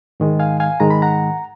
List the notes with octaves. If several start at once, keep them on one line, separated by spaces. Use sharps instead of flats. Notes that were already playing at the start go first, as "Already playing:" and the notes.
G#2 D#3 G#3
F5 G#5
F5 G#5
G#2 D#3 G#3 A#5
B5
F#5 A#5